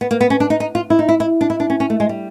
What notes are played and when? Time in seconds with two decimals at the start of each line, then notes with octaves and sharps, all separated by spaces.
0.01 B3
0.11 A#3
0.21 B3
0.30 C#4
0.40 D4
0.50 D#4
0.60 D#4
0.75 F4
0.90 E4
0.99 D#4
1.09 E4
1.20 E4
1.41 D4
1.50 E4
1.60 D4
1.70 C#4
1.80 C#4
1.90 A3
2.00 G#3
2.09 G3